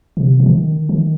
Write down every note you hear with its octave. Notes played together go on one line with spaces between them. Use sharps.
C3
C3
D#3
D#3